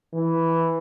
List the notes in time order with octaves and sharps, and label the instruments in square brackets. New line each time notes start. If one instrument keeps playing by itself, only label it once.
[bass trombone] E3